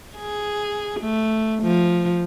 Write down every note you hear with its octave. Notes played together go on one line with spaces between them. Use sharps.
G#4
A3
F3